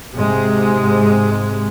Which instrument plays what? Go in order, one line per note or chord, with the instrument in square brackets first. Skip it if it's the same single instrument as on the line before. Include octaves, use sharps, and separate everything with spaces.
[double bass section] G#2 C3 G#3